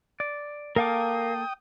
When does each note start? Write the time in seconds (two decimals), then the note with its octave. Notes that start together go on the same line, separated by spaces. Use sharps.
0.20 D5
0.76 A#3 A4 A#4 F5 G5 D6 D#6